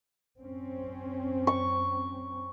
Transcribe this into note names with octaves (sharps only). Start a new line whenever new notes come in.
F#2 C4 C#4
C#6